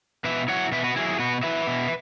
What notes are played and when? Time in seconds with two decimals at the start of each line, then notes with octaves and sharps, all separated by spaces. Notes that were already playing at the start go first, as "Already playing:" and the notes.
0.24 B2 B4 E5
0.48 F#3 E4 C#5 F#5
0.72 B2 B4 E5
0.84 F#4 B4
0.96 F#3 E4 G#4
1.08 G#4
1.19 B2 F#4 B4
1.43 F#3 E4 B4 E5
1.67 B2